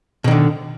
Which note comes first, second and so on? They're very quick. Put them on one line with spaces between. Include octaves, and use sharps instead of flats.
B2 D#3 D3